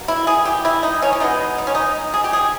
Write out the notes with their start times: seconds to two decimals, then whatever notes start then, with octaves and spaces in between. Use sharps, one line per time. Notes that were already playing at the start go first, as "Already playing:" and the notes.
Already playing: B2 G3 A#3
0.08 E4
0.27 G#4
0.45 G4
0.65 E4
0.83 D#4
1.02 C#4
1.13 C#4
1.20 B2 G#3 B3 D#4
1.58 D#4
1.67 C#4
1.75 D#4
2.14 G#4
2.24 G4
2.33 G#4